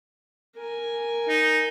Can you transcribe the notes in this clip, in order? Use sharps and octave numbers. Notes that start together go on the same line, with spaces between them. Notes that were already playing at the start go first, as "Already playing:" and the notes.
A#4 G#5
D#4